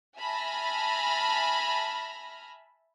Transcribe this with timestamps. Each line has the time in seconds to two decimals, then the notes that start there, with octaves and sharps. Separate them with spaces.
0.19 E5 G#5 A5 B5 F6 A#6